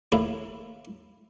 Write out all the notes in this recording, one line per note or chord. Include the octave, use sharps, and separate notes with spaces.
D#2 A2 E4 F4